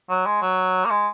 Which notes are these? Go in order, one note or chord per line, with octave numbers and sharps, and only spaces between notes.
F#3
G#3
F#3
A#3
G#3